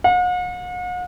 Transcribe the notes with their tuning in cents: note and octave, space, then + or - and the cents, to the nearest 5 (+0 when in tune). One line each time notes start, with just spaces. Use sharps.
F#5 -45